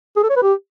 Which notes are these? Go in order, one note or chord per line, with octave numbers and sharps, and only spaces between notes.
G#4
A4
C#5
B4
G4